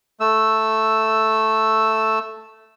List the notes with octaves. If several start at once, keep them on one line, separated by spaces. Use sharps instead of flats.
A3 E6